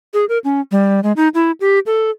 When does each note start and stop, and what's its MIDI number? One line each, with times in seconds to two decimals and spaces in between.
0.14 0.25 68
0.29 0.38 70
0.44 0.61 61
0.71 1.00 55
1.03 1.12 56
1.16 1.28 63
1.34 1.52 64
1.61 1.79 67
1.86 2.10 69